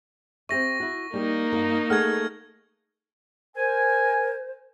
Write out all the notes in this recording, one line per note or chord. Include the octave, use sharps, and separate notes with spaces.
C4 G4 E5 C#6 A#6
E4 F#4
G3 A#3 D#4 G4
G2 F#4 A#4
A3 G#4 F#5 F6 G#6
A#4 C5 G#5